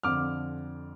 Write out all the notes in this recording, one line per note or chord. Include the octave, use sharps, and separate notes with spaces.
F2 D3 F3 D6 F6